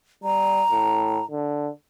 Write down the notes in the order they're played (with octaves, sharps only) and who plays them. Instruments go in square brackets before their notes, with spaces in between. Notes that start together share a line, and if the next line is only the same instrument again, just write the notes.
[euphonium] G3 [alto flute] A#5
[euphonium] A2
D3